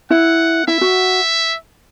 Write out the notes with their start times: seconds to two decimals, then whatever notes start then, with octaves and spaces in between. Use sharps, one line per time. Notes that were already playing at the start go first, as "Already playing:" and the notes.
0.10 E4 F#5
0.67 E4 E5
0.81 F#4